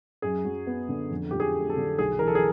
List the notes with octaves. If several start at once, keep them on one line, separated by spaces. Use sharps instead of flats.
F#2 G#4
F#3
B3
D3
F2
F3 G4
G#4
A3
A4
D3
B1 G#4
E3 A#4
A4
G#4